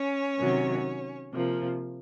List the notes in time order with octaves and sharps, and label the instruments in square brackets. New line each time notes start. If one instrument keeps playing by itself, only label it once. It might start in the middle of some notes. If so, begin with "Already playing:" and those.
Already playing: [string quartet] C#4 C#5
C3 D#3 F#3
C3 F3 A#3